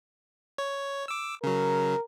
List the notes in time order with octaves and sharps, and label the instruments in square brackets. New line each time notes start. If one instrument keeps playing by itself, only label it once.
[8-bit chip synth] C#5
D6 E6
[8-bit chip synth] C#3 F#3 [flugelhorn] A#4